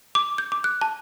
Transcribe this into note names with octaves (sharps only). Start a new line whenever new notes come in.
D6
G6
D6
F#6
A5